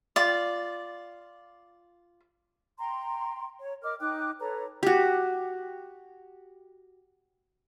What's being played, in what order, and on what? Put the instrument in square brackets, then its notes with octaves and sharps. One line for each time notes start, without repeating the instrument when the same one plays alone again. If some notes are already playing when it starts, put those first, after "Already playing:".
[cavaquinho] F4 D5
[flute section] G5 A#5 C6
C#5
A#4 D#5 D6 F6
D#4 G5 D6 F#6
A4 B4 C#5 A#5
[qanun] F#4 G4